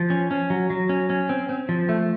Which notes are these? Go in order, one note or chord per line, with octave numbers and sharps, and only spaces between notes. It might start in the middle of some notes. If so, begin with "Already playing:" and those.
Already playing: F3
C#4
C#4
F#3
F#3
C#4
C#4
C4
C4
F3
A3